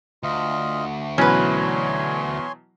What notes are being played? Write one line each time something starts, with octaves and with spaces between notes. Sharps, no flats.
D2 F4 D#5
B2 E3 F#3 C#4 B4 C#5 G#5 C6